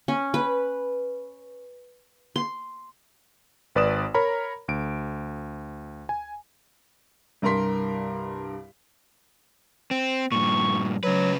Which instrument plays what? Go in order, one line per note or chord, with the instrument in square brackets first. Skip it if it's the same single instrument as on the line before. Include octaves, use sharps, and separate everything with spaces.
[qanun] C#4
B4
C6
[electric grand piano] G#1 B4 D5 D#6 E7
A#4 C#5 A#5 B5
D2 D7
G#5
[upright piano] C2 G2 A#4 A#5 C6 B6
[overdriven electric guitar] C4
[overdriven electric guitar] G2 A#2 [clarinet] C#6
[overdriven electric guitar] C#3 B4 [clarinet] F#3